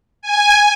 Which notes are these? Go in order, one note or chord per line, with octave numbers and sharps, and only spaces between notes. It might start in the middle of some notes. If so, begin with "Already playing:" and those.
G#5